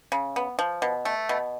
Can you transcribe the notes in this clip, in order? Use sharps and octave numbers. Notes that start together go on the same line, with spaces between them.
C#3
B3
F3
B2
A3
B2